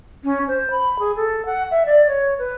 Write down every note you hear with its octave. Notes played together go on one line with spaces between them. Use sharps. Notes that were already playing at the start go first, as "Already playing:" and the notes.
C#4
C5
B5
G#4
A4
F#5
E5
D5
C#5
B4